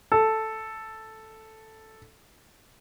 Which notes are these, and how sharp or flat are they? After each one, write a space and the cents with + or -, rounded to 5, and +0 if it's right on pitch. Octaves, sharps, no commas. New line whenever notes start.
A4 +0